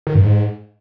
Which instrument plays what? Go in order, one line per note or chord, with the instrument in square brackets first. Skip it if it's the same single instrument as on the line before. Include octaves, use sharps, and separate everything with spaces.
[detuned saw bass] D#3
G2
G#2